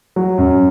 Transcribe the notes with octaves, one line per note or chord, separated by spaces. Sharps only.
F#3
F#2